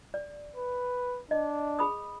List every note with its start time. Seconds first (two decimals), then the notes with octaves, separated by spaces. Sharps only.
0.14 D5
0.56 B4
1.31 D4 D#5
1.79 G#4 B5 D#6